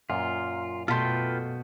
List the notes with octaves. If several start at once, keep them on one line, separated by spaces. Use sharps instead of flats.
F#2 A#2 F4
B2 A3 F4 A4 B4 G5 C6